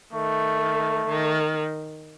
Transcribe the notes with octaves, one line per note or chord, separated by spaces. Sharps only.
D#3 A3
D#3